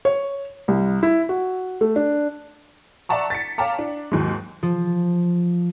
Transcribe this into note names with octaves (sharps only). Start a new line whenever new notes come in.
C#5
C2
E4
F#4
A3
D4
D5 E5 F#5 A5 A#5 C#6
A6 B6 C#7
C#5 F5 G5 A5 A#5 D6
D4
D#2 G#2 F#3 G#3
F3